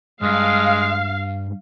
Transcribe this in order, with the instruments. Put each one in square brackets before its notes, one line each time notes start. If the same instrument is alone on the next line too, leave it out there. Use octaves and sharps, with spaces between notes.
[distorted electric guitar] G2 [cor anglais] G#3 [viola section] F5